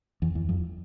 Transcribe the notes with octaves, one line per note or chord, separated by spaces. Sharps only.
E2
E2
F2